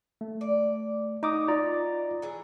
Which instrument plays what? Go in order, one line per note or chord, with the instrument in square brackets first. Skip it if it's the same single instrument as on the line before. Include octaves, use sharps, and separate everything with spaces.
[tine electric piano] A3
[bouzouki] D5
[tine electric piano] D#4 D6 D#6 [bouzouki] F#4
[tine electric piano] F4 D5 A#5
[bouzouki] E3 F#3 G#4